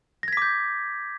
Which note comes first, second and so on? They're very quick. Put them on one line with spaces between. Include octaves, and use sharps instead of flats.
A#6 G#6 B6 D6 G6